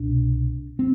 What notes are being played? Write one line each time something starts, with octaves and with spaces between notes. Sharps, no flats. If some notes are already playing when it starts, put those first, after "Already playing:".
Already playing: C2 B2 D4
C4